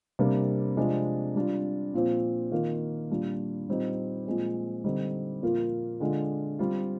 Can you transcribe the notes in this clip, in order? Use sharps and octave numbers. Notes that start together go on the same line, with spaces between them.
C3 G3 A#3 D4
C3 F3 G#3 D4
G3 D4 F4
A#2 F3 C4
D#3 A#3 F4
A#2 G3 D4 F4
A#2 G3 C4 D#4
A#2 F3 G#3 C4
D3 G3 C4 D#4
A#2 F3 A#3 F4
D3 G#3 D4 F4
G3 C4 F4